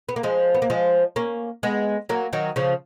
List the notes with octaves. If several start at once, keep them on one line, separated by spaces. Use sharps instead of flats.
B3
A#3
F3 G#3
B3
A#3
F3 G#3
A#3 C#4
G#3 B3
F#3 A#3
D#3 F#3
C#3 F3